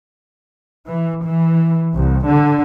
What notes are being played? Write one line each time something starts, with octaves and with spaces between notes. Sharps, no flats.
E3
E3
C2
D3